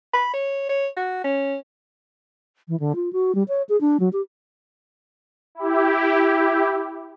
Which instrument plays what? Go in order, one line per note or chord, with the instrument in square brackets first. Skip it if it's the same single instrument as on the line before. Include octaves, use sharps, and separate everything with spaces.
[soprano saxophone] B5
C#5
C#5
F#4
C#4
[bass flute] E3
D3
F4
F#4
G3
C#5
G#4
D4
F#3
G4
[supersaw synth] E4 G4